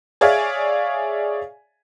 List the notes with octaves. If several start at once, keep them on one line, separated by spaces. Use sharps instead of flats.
G#4 C#5 D5 E5 F5 G#5